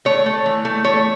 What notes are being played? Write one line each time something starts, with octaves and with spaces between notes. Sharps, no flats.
A3 C#5
A3
E3
A3
A3 C#5